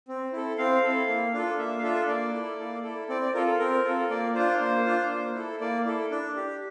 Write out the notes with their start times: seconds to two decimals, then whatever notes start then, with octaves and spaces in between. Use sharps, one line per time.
0.08 C4
0.33 E4 A4
0.58 C4 F5
0.83 E4 A4
1.08 A#3
1.34 D4 F4 A4
1.59 A#3 E5
1.79 F5
1.83 D4 F4 A4 E5
2.08 A#3 D5
2.33 E4 A4
2.59 A#3
2.83 E4 A4
3.09 C4 D5
3.22 D5
3.34 F4 A4 A#4
3.47 A4
3.59 C4 A#4
3.84 F4 A4
4.10 A#3 D5
4.35 D4 F4 C5
4.60 A#3
4.86 D4 F4
5.10 A#3
5.35 E4 A4
5.60 A#3 D5
5.85 E4 A4
6.11 D4
6.36 G4